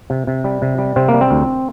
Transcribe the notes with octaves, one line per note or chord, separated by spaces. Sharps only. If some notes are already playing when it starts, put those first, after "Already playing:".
C3
C3
G3
C3
G3
C3 C4
A#3
G3
C4
D2